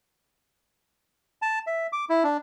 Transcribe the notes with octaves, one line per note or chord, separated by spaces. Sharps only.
A5
E5
D6
E4
D4